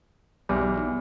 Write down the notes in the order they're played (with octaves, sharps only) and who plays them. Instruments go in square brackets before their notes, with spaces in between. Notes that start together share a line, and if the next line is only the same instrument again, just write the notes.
[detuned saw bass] B1 [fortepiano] E2 G3